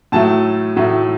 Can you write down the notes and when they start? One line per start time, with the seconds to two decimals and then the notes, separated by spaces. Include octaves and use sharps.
0.12 A2 F#3 A3 A5
0.76 A2 F#3 A3